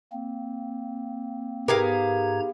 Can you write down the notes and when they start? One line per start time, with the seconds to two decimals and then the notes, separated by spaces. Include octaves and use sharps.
0.12 A#3 C4
1.68 G#2 B3 G4 G#4 A#4 F5 A#5 G#6